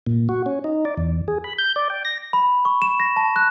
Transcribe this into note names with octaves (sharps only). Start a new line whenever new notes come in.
A#2
F#4
C#4
D#4
D5
E2
G#4
B5
G6
D5
G5
A#6
B5
C#6
E7
A#6
A5
F#6